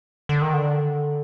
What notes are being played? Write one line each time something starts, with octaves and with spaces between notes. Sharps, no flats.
D3
D#3
D3